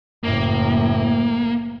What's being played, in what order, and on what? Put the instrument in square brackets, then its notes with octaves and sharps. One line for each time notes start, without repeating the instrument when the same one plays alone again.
[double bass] F#1 A2 [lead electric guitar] A#3